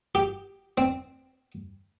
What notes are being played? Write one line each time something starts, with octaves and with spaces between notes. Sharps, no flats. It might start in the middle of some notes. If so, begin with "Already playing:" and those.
G4
C4